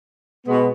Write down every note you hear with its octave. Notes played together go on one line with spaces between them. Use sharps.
B2 G#3 B3